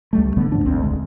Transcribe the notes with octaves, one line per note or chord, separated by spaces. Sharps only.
C#2 G3 A3
D1 C2 D3 B3
D2 G#2 F3 D4
G#1 D2 C4
D#1 C#2 G#3